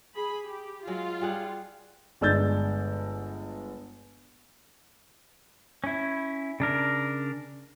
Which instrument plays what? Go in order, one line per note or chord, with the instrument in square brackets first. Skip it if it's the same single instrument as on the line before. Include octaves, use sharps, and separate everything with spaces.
[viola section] G#4 B5
G4
[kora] F#3 G#3 F#4 [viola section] F4
[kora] G3 G#4 F#5
[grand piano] G1 G#3 D4 E6 G6 A6
[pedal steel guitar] C#4 E4
C#3 D4 A#4